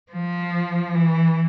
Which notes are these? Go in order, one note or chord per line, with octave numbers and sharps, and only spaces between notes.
F3
E3